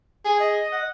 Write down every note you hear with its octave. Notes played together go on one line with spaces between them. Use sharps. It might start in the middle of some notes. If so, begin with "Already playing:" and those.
G#4 G#5
D#5
F#5